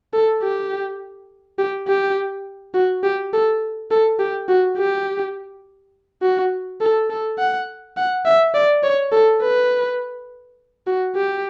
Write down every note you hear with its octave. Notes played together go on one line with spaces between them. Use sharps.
A4
G4
G4
G4
F#4
G4
A4
A4
G4
F#4
G4
F#4
A4
A4
F#5
F#5
E5
D5
C#5
A4
B4
F#4
G4